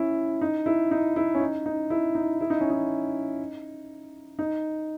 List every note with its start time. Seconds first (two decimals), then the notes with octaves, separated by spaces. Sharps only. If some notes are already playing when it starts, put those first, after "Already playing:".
Already playing: C#4 E4
0.41 D#4
0.66 E4
0.91 D#4
1.16 E4
1.35 C#4
1.40 D#4
1.66 D#4
1.90 E4
2.15 D#4
2.41 E4
2.50 D#4
2.60 C#4
2.70 D#4
4.39 D#4